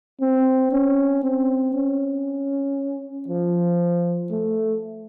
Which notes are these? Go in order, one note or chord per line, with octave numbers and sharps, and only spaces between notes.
C4
C#4
C4
C#4
F3
A3